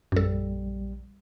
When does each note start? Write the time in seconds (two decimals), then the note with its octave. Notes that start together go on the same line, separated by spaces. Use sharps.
0.12 A#1 F#2 G3 A4